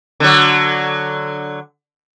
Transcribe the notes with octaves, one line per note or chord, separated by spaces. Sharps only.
D3 F#3